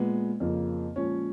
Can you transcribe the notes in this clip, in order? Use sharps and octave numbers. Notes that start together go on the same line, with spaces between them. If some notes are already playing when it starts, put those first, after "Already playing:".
Already playing: A#2 G#3 B3
F2 C#3 F3 A#3
A#2 F3 G#3 C#4 C#5